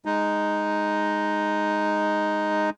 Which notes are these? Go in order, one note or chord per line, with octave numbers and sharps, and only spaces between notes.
G#3 D#4